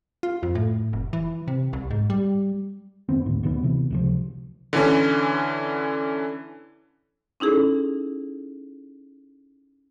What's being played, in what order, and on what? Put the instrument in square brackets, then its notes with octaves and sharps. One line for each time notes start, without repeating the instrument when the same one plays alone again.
[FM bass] F4
F2
A2
F1
E3
C3
C2
G#2
G3
[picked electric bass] F2 D#3 B3 C4
D2 A2 D#3
D2 B2 D#3 B3
C3 E3
C#2 C3 F3
[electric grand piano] D3 E3 C#4
[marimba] C#4 D#4 E4 G#4 A4